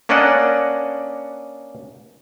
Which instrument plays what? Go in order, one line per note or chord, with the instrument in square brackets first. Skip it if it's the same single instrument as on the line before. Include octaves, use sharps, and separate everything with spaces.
[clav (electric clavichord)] A#3 C#4 D4 D5 D#5 F#5